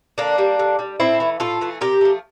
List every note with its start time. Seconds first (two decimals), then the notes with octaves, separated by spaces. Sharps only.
0.18 D3 A#3 D4
0.38 G3
0.59 D3
0.79 G3
1.00 A2 C4 E4
1.20 E3 A3
1.40 A2 F4 A4
1.61 E3 A3
1.81 C3 G4 A#4
2.01 F3 A3